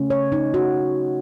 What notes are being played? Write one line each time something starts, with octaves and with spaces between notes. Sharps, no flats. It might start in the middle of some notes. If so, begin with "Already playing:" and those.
Already playing: C#3 A3 C#4
C#5
D#4
F#4